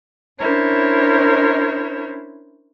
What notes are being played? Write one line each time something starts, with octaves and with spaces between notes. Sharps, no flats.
C#4 D4 E4 A#4 C5 C#5